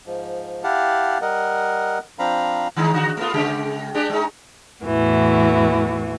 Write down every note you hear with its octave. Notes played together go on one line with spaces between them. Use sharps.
G#2 F3
E4 G4 F5 F#5 A5
G3 A#4 D#5 F#5
F3 C4 D4 F5 A#5 B5
D#3 G#3 D#4
D3 F#4
A3 B3 F4
C#3 G#3 G4
G#3 D4 G4
G#3 D#4
E2 A2 E3 F#4